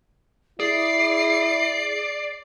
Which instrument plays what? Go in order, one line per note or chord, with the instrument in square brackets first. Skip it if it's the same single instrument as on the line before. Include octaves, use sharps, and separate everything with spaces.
[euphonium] E4 [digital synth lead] G#4 [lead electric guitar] D5 [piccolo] C7